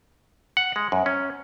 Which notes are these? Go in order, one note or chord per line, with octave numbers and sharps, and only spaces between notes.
F#5
G#3
F#2
C#4